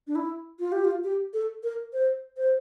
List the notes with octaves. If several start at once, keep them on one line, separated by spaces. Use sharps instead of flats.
D4
E4
F4
G4
F4
G4
A4
A#4
C5
C5